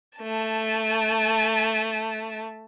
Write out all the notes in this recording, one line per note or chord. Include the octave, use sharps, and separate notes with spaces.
A3 A5